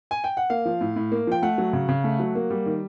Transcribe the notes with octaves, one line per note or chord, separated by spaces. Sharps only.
G#5
G5
F#5
A#3 F5
F3
A2
A2
A#3
F3 G5
A3 F#5
F#3
C#3
C#3
A3
F#3
A#3
G3
D#3